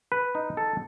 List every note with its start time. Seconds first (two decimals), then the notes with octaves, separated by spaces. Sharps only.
0.12 B4
0.35 D#4
0.57 A4